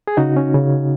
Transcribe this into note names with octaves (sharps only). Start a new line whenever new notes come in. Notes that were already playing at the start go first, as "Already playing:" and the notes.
G#4
C#3 D#4 F#4
C#4
C#3